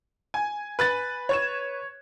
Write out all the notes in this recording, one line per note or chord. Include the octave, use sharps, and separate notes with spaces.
G#5
B4 F#6 A6
C#5 G#6 E7